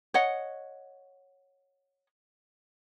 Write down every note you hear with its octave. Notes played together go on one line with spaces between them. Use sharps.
C#5 D#5 F#5